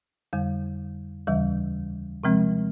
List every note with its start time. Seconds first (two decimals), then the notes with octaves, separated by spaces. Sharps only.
0.33 F2 D3 G3
1.27 D#2 C#3 E3 G3
2.24 C3 F3 G#3 C4